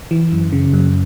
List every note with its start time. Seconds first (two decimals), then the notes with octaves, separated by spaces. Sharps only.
0.11 E3
0.32 F#2
0.53 C#3
0.73 F#2